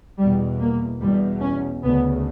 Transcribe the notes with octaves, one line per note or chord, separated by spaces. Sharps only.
E2 B2 G3
A#3
E2 B2 G3
C#4
D2 C#3 B3